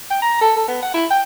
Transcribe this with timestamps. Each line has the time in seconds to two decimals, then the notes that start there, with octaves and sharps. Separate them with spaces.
0.10 G5
0.22 A#5
0.41 A4
0.56 A4
0.68 B3
0.83 F#5
0.94 E4
1.11 G5